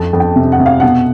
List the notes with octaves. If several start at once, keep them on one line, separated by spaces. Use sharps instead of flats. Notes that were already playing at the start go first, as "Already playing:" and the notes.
Already playing: F2 A5
F2
G5
C3
F#5
C3
F5
B2 F#5